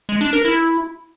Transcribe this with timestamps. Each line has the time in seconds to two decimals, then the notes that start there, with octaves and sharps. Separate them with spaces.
0.09 G#3
0.21 D4
0.33 A#4
0.45 E4